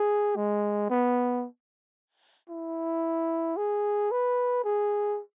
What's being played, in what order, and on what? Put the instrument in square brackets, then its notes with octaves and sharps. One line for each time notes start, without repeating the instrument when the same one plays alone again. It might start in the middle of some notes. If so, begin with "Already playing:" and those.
Already playing: [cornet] G#4
G#3
B3
E4
G#4
B4
G#4